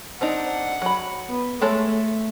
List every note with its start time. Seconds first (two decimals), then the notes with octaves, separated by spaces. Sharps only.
0.21 C4 D4 D#4 F#5
0.82 F#3 B5
1.29 B3
1.62 G#3 A3 A4 C#5